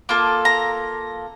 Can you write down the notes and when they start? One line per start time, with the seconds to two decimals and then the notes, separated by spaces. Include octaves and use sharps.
0.09 A#3 F4 A4 D6
0.45 A#5